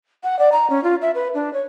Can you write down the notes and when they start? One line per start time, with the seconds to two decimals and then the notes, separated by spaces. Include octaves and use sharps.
0.24 F#5
0.39 D5
0.52 A#5
0.70 C#4
0.84 F4
1.02 E5
1.15 B4
1.34 D4
1.53 C#5